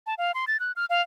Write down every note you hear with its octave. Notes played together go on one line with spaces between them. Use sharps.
A5
F5
C6
A6
F#6
F6
F5